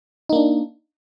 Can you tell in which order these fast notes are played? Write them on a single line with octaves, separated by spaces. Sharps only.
D#4 A#3 D4